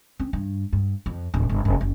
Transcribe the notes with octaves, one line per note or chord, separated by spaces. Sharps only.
C4
G2
G2
F2
D1
G1
F#1
F#1